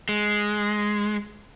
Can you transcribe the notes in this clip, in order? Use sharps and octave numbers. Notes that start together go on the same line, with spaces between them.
G#3